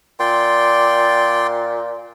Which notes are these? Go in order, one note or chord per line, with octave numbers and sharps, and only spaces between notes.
A#2 D5 G5 C6